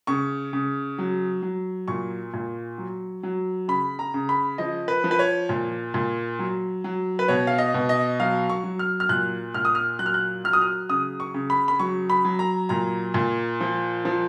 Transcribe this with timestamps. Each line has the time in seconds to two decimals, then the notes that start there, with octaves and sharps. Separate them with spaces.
0.07 C#3 C#6
0.53 C#3
0.98 F#3
1.42 F#3
1.88 A#2 C#6
2.34 A#2
2.78 F#3
3.23 F#3
3.68 C#3 B5
3.99 A#5
4.14 C#3
4.29 B5
4.58 F3 D#5
4.88 B4
5.04 F3
5.11 B4
5.19 C#5
5.49 A#2
5.94 A#2
6.39 F#3
6.84 F#3
7.19 B4
7.28 B2 C#5
7.47 F5
7.58 D#5
7.74 B2
7.89 D#5
8.20 F#3 F5
8.49 C#6
8.64 F#3
8.79 F6
9.00 F6
9.09 A#2 F#6
9.54 A#2 F6
9.65 D#6
9.75 F6
9.99 F#3 F#6
10.06 F6
10.14 F#6
10.44 F#3 F6
10.53 D#6
10.61 F6
10.89 C#3 D#6
11.20 C#6
11.34 C#3
11.50 B5
11.68 B5
11.80 F#3 C#6
12.10 B5
12.25 F#3
12.39 A#5
12.69 A#2 A#5
13.14 A#2
13.61 F3
14.05 F3